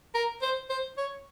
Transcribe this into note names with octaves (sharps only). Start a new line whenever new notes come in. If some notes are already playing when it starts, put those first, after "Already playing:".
A#4
C5
C5
C#5